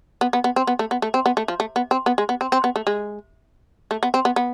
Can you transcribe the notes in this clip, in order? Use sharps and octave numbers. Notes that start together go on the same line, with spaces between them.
B3
B3
B3
C4
B3
A3
B3
A3
C4
B3
A3
F3
A3
B3
C4
B3
G#3
B3
C4
C4
B3
A3
G#3
A3
B3
C4
B3
B3